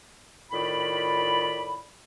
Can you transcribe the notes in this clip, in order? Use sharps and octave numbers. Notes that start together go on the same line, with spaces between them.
A2 D#3 F4 D5 B5